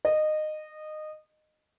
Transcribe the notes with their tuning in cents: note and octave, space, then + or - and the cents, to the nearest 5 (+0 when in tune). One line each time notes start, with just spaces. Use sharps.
D#5 -20